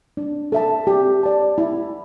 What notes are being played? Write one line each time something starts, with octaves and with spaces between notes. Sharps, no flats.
D4
A4 E5 A5
G4
D5 A5
E4